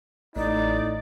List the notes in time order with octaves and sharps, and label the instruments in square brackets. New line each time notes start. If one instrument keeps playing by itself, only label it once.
[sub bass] A1 [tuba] A2 [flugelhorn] D#4 [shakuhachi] D5